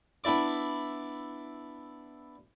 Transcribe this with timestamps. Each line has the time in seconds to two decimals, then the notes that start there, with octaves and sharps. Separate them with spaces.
0.24 B3 D4 E4 D5 D6